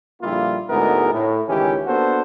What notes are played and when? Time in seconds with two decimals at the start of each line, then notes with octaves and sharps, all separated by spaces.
0.21 A#1 D3 G3 A#3 E4 F4
0.70 D2 G#2 G#3 B3 E4 A#4
1.13 A2
1.48 C#2 D#3 E3 C#4 G4
1.86 A#3 B3 D4 F#4 A4 C5